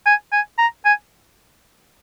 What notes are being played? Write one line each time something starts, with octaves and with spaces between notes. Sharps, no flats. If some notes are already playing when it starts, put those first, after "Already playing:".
G#5
G#5
A#5
G#5